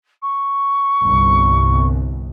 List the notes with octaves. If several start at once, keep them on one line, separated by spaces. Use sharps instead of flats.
C#6
G1 C2